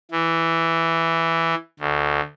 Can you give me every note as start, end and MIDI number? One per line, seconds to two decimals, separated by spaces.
0.11 1.54 52
1.79 2.21 38